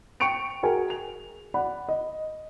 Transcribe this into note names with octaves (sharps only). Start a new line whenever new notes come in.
G5 C#6 C#7 D7 F7
F#4 G#4 A#4 G5 G#5
F7
D5 F#5 B5
D#5